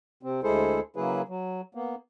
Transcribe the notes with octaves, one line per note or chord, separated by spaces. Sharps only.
C3 C4
D2 G#3 E4 G#4 A4 C5
C#3 F#3 A#3 E4 G#4 B4
F#3
A#3 B3